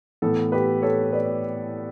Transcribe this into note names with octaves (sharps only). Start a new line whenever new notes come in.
A2 E3 B3 A4
G4 B4
A4 C#5
B4 D5